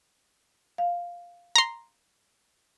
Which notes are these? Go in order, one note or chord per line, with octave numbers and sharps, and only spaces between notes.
F5
A#5 C6